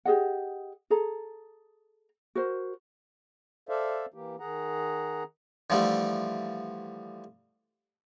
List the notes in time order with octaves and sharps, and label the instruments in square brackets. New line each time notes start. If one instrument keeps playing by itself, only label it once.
[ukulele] G4 G#4 D#5 F#5
G#4 A4 A#5
F#4 A#4 C5
[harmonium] A4 C5 D5 E5 F5
E3 A#3 G4
D#3 G#4 F#5 A#5
[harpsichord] D3 E3 F3 G3 A3